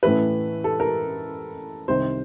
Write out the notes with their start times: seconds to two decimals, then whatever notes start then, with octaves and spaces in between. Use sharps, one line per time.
0.03 A2 E3 A3 C#4 B4
0.64 A4
0.80 A#4
1.88 C2 C3 D#3 C5